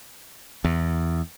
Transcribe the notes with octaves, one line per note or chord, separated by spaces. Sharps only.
E2